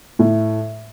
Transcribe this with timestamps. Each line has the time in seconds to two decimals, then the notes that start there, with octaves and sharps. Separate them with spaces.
0.19 A2